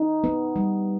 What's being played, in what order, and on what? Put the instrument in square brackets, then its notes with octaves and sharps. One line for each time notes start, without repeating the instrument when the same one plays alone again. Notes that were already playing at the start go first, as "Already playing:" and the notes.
Already playing: [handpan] D#4
B3
G3